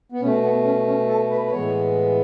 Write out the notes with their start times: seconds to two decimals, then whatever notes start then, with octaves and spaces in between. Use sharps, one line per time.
0.12 B3
0.21 B2 A3 C#4
0.43 B3
0.64 C#4
0.87 C#4
1.08 A4
1.30 B4
1.46 B4
1.51 A2 E3 G#3 B3 C#5